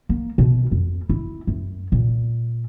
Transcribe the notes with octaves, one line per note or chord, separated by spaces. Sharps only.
A#3
B2
F2
E4
F#2
A#2